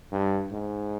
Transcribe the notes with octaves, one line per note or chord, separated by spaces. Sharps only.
G2
G#2